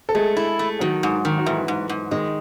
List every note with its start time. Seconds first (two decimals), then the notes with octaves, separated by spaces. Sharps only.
0.09 A4
0.15 G#3 A3 G#4
0.37 E4
0.59 A3
0.80 D#3 F#3 F#4
1.03 G#2
1.25 D#3
1.38 F#4
1.46 G#2 E3 E4
1.68 G#2
1.89 G#2
2.11 D#3 G#3 D#4